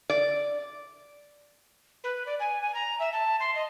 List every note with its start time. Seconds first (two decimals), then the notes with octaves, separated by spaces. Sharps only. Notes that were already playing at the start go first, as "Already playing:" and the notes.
0.10 D5
2.04 B4
2.26 D5
2.40 G#5
2.62 G#5
2.74 A#5
2.99 E5
3.13 A5
3.40 C6
3.55 D#5